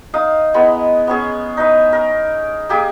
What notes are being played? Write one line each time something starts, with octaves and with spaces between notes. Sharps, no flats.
D#4 F5 D#6
G#3 B3 E4 B5
B3 C#4 G#4
D#4 B4 E5
A#4
A#3 G4 G#4